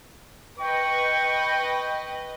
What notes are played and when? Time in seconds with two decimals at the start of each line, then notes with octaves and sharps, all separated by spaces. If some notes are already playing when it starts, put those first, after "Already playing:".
0.60 B4 D#5 G5 C#6